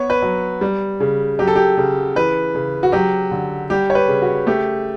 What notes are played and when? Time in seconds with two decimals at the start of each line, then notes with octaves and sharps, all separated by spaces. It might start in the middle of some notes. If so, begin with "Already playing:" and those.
Already playing: B3 C#5
0.10 B4
0.22 F#3
0.61 G3
1.00 C#3
1.39 F#3 G4
1.47 A4
1.56 G4
1.77 C#3
2.15 E3 B4
2.55 C#3
2.83 F#4
2.92 F#3 G4
3.31 D3
3.70 G3 G4
3.90 C#5
3.95 B4
4.08 C#3
4.22 F#4
4.47 A3 G4